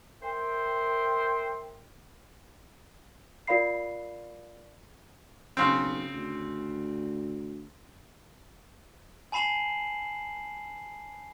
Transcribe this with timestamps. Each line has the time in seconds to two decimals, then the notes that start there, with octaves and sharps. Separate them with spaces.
0.23 A#4 C5 E5 G5
3.47 F4 A#4 D5 F5 B5 C7
5.57 B1 C#3 C4
6.14 D2
9.32 G#5 A5 B5 C7 E7 F#7